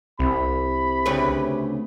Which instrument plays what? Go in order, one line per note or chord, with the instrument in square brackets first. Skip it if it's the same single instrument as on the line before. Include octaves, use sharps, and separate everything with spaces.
[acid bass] C2 [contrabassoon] C3 [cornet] B5
[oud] D2 C#3 B4